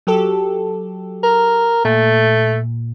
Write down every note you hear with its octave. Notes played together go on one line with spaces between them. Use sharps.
F#3 G4 A4
A#4
A#2 A3